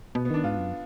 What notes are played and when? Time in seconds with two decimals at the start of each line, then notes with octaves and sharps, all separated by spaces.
0.15 B2 B3
0.25 B3
0.30 D#3 D4
0.44 G#2 F4
0.58 F#2